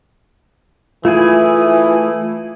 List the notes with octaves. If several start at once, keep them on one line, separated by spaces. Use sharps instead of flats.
E3 A3 E4 F4 G#4